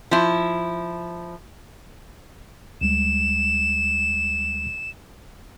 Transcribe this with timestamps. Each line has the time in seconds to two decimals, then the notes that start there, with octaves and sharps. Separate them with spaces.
0.11 F3 E4
2.81 D2 G3 G#3 E7